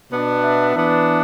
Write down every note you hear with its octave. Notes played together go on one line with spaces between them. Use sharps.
B2 B3 D4
E5
E3 B3 D4